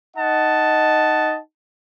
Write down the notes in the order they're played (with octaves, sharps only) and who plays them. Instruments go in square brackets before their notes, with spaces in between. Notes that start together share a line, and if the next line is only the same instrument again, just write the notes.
[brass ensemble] D#4 D#5 F#5 A5